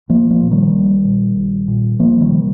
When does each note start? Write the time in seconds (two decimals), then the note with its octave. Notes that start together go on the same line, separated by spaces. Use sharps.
0.09 A#1 F3 A#3
0.30 F3 A#3
0.41 A#2
0.51 D#3 G3
0.73 A#1
1.05 A#2
1.36 A#1
1.68 A#2
1.99 C2 F3 A#3
2.21 D#3 G3
2.31 C3